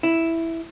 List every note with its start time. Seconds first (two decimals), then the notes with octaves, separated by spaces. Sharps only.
0.03 E4